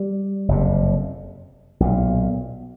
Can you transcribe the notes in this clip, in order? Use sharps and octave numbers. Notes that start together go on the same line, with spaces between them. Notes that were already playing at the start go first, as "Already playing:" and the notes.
Already playing: G3
F#1 F2 C3
B1 A#2